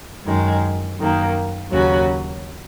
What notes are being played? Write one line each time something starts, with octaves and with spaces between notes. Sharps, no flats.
F#2 D#3 G#3
F#2 D#3 A#3
D#2 C#3 F#3 C#4 F#4